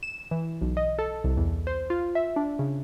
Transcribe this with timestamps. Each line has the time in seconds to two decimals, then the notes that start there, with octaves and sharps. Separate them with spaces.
0.03 E7
0.31 E3
0.62 B1
0.77 D#5
0.99 A4
1.24 C2
1.37 E2
1.67 C5
1.90 F4
2.15 E5
2.36 D4
2.59 C#3